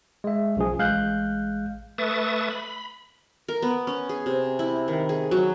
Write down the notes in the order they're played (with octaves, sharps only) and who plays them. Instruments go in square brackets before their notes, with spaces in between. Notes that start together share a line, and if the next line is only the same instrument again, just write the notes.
[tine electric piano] G#3 E5
B1 C#3 F3 G#4
A1 G#3 F5 F#6 G6
[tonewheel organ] A3 B4 E5 C#6 D#6 A6
B5
[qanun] A#4
B3
C#4
G#4
C3
E4
D#3
G#4
F#3